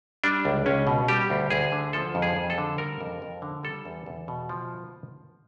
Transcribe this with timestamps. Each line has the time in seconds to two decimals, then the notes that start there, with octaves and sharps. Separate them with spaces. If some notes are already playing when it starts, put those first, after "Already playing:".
0.24 G3 D4
0.45 C#2
0.66 C#2 C#4
0.87 B2
1.08 G3 G4
1.30 D2
1.50 D2 G#4
1.72 D3
1.93 F3 A4
2.15 F2
2.22 G#4
2.37 F2
2.50 A4
2.58 D3
2.78 G3 A#4
3.01 F2
3.22 F2
3.42 D3
3.63 G3 A4
3.85 E2
4.06 E2
4.28 B2
4.49 F3